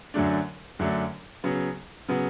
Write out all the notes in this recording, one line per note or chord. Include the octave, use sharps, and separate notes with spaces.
F#2 D3 F#3 A3 D4
F#2 D3 F#3 A3 D4
C#3 F#3 B3
C#3 F#3 B3